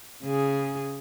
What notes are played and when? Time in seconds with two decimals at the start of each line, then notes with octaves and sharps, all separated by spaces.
0.24 C#3 G#4